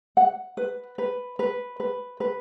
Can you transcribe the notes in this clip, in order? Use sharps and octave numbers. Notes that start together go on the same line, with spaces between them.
F#5
B4
B4
B4
B4
B4